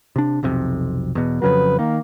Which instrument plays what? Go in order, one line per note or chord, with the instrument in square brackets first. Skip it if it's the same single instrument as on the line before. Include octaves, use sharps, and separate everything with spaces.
[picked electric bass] C3 D4
B1 F2 C3
E2 B2
[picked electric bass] F2 C#3 F#3 [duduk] B4
[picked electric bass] D#3 [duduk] A#3